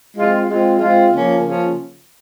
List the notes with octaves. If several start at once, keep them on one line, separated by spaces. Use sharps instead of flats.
G#3 C4 F4
G#3 C4 F4
G#3 C4 F4
C#3 F3 A#3 C#4
C#3 F3 A#3 C#4